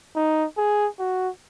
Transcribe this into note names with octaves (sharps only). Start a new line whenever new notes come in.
D#4
G#4
F#4